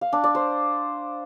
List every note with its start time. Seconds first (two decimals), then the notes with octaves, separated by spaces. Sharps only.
0.01 F5
0.13 D4
0.24 D5
0.35 C5